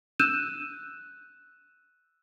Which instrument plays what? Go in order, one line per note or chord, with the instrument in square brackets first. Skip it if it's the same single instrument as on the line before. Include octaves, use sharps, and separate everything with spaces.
[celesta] E6 F#6 G6 D#7 E7